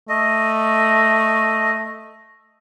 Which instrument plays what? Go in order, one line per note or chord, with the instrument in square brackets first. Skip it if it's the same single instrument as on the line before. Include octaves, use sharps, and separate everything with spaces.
[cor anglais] A3 [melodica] D#5